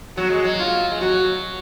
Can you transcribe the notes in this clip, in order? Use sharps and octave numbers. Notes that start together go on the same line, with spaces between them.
F#3 F#4
G#3
F#3
F4
G#3
F#3 F#4